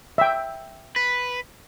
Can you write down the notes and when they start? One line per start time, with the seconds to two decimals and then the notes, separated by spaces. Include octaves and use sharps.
0.18 E5 G5
0.96 B4